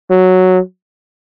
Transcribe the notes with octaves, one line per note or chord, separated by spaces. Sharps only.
F#3